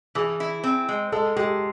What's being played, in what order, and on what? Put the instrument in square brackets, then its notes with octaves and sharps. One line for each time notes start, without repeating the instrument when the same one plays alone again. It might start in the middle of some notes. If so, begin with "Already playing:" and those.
[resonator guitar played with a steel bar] E3 [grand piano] G#4
[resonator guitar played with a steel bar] E4
C4
G#3
[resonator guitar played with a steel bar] G#3 [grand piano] A4
[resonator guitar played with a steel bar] G#3 [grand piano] G4